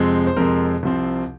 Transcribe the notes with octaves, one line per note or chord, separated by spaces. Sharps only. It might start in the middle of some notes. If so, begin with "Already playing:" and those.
Already playing: F2 C3 F3 G#3 C4
C5
F2 C3 F3 G#3 C4 A#4
C2 C3 F3 C4